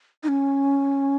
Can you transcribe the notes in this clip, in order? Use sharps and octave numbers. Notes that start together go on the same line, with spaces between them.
D#4
C#4